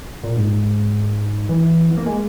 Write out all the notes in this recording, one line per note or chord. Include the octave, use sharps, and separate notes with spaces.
A#2
G#2
E3
B3
A#3
G#3